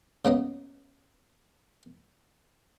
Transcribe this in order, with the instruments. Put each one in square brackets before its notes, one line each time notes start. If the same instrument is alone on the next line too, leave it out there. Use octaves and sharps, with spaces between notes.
[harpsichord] C#3 A#3 B3 D#5